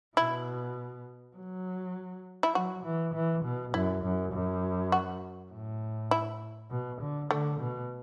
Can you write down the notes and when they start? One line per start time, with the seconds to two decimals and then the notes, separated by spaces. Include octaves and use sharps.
0.17 B2 E4
1.36 F#3
2.43 E4
2.55 F#3 F#4
2.85 E3
3.14 E3
3.44 B2
3.74 F#2 E4
4.04 F#2
4.33 F#2
4.92 F#4
5.52 A2
6.11 E4
6.70 B2
7.01 D3
7.31 D3 A3
7.60 B2